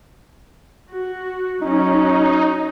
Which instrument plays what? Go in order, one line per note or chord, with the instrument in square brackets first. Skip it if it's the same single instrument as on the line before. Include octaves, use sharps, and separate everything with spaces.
[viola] F#4
[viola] F#3 C#4 [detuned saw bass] D#4